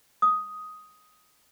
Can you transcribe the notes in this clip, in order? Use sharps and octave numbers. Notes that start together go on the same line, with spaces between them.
D#6